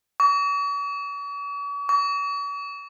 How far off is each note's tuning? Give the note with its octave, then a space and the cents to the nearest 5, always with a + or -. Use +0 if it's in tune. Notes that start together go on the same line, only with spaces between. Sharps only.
C#6 +45
C#6 +45